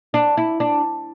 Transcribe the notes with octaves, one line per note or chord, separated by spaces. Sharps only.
D4
E4
D4